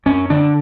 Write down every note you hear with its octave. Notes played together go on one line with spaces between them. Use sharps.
F#2 C#4
D3 D4